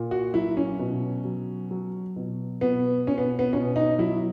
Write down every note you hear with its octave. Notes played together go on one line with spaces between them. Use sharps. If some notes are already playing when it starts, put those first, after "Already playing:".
Already playing: A#2
F#4
F#3 E4
C#4
B2
F#3
F#3
B2
B2 B3
B2 C#4
B3
B3
B2 C#4
D#4
F#3 E4